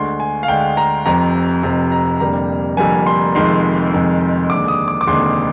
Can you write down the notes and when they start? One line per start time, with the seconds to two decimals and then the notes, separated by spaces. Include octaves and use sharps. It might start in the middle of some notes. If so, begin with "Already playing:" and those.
Already playing: D2 D3 G#3 C6
0.20 G#5
0.43 F5
0.48 D2 D3 G#3 G5
0.77 A#5
1.06 F1 F2 C3 A#5
1.63 F1 F2 C3
1.92 A#5
2.20 F1 F2 D3 G3 A#3 A#5
2.77 F1 F2 D3 G3 A#3 G#5
3.06 C6
3.35 F1 F2 D#3 G#3 C6
3.93 F1 F2 D#3 G#3
4.49 F1 D#2 D3 G#3 D6
4.68 D#6
4.88 D6
5.01 D6
5.06 F1 D#2 D3 G#3 C6